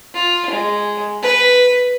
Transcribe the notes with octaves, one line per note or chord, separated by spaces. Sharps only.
F4
G#3
B4